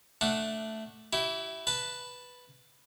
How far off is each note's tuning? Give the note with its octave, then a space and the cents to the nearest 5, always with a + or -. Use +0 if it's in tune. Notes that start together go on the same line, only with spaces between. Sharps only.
A3 +0 D4 +0 F#5 +0
E4 +0 G4 -45
B4 +0 A5 +0